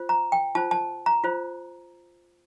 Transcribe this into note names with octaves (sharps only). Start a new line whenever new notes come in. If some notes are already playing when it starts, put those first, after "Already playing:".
Already playing: F4 C5
A#5
G5
F4 C5 A5
A5
A#5
F4 C5